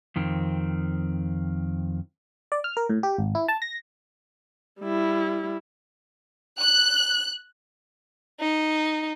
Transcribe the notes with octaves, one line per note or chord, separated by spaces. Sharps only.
F2 D#3 C4
D5
F6
A#4
A2
G4
G#1
E4
A5
A#6
G3 E4
F#6
D#4